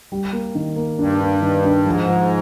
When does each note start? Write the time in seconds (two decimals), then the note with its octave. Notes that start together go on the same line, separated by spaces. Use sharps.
0.12 G3
0.33 A#3
0.55 D#3
0.76 A#3
0.99 G2 D4
1.20 D4
1.42 D#3
1.64 D4
1.86 G#2 F3
2.08 F3